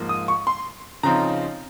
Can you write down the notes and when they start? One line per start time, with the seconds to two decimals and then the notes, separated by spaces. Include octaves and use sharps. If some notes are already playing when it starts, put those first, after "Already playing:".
Already playing: G#2 F3 A#3
0.09 D#6
0.28 C#6
0.47 C6
1.03 C#3 F3 C4 D#4 A#5